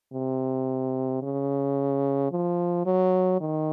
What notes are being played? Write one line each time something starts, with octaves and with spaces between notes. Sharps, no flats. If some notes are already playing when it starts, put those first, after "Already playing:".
C3
C#3
F3
F#3
D#3